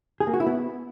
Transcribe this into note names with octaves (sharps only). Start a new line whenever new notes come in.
G#4
A#3
F#4
E4
B3